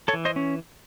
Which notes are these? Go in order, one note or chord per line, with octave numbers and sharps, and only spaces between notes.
A4 C#5
E3
C5 D#5
C#4